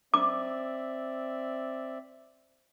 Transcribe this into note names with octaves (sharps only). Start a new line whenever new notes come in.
C4 D5 E5 D6